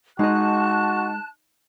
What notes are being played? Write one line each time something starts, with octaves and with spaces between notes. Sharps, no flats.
G#3 D#4 F#4 D#5 A5 F#6